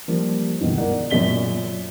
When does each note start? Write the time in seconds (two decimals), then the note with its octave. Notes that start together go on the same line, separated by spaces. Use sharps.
0.08 F3 G3 A#3
0.60 G1 C#2 B2 D#3 E3
0.77 A#4 D5 F#5
1.10 F#2 A#2 C#5 B6 G7